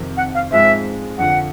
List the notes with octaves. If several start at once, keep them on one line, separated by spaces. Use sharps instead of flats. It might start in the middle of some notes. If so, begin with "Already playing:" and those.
Already playing: F2 C3 D#3
F#5
F5
G#2 F3 G#3 C4 E5
F2 D3 F3 F#5